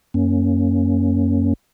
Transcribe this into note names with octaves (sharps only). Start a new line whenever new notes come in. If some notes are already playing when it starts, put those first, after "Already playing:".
F#2 A#3 C#4